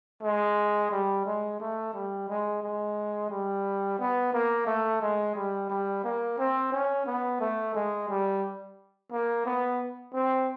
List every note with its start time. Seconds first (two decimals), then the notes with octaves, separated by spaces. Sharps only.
0.22 G#3
0.91 G3
1.26 G#3
1.60 A3
1.93 G3
2.28 G#3
2.62 G#3
3.30 G3
3.99 B3
4.33 A#3
4.67 A3
5.01 G#3
5.35 G3
5.70 G3
6.04 A#3
6.38 C4
6.72 C#4
7.06 B3
7.40 A3
7.74 G#3
8.08 G3
9.11 A#3
9.45 B3
10.13 C4